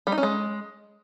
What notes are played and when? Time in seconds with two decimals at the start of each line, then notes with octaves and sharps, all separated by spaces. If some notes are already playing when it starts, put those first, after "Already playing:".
0.07 G3
0.12 D#4
0.18 C#4
0.23 G#3